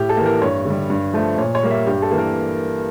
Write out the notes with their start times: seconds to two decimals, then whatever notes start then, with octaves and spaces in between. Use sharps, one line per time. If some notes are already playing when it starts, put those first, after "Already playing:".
Already playing: A2 G4
0.09 A4
0.17 E3 A#3
0.26 A#4
0.42 G2 C#5
0.65 D3 G3
0.90 G2
1.14 F3 A3
1.38 A#2 C#5
1.55 C#5
1.63 G3 A#3
1.71 E5
1.86 G2 G4
2.02 A4
2.11 E3 A#3
2.18 A#4